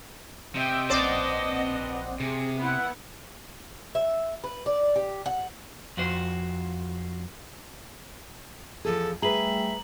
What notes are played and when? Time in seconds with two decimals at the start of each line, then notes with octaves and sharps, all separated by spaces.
0.55 C3 D#5 E5 G5
0.90 A#1 C4 B4 C5 D5 D#5 F#5 A5
2.20 C3 G#4
2.59 B3 E4 F#5
3.95 E5
4.44 B4
4.66 D5
4.96 G4
5.26 F#5
5.97 F2 F#4 C5
8.85 E2 F3 G#4 A4
9.22 G3 A3 G#4 B4 E5 G5 A#5 F#7